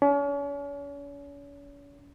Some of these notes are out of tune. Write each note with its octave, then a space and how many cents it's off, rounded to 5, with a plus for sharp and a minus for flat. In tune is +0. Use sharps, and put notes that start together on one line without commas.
C#4 +40